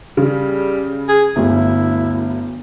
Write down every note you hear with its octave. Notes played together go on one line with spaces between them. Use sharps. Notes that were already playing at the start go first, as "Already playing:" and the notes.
C#3 G3
G#4
G1 D2 E4